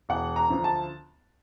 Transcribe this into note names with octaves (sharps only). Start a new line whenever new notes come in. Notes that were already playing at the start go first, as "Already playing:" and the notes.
E1 F#5
A#5
D2 D3 F3
A5